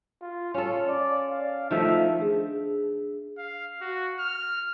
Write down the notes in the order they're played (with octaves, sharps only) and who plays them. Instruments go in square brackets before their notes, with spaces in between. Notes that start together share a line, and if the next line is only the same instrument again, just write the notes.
[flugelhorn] F4
[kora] C#4 A4 [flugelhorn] F4
[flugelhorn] D5
F5
[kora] D#3 F3 A3 [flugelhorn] E5
[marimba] D4 G#4
[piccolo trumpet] F5
F#4
F6